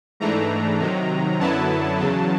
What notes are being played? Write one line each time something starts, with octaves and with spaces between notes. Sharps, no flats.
G#2 E3 A3 D4 A#5
C3 D#3 F#3
F#2 D3 F#3 B3 E4 A5
E2 C#3 F#3